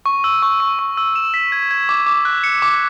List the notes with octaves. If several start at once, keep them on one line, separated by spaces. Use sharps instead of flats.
C#6
E6
C#6
C#6
C#6
E6
E7
B6
G#6
G#6
D6
D6
F#6
C#7
D6